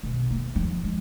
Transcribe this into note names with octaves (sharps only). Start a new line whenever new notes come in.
B1
A#3
F3
G#3